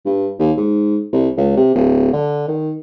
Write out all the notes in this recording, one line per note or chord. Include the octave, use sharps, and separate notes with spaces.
G2
D#2
G#2
C2
C#2
C3
D1
D3
D#3